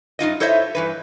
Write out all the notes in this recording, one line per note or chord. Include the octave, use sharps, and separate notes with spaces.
G2 D#4 F4 D#5
E4 A4 C5 C#5 D#5 E5
G2 E3 B4